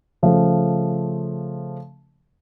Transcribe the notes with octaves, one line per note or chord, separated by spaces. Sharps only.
C#3 F3 A3